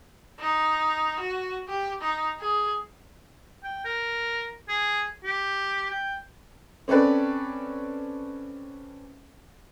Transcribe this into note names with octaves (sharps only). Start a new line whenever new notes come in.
D#4
F#4
G4
D#4
G#4
G5
A#4
G#4
G4
G5
C4 C#4 A4 B4 D5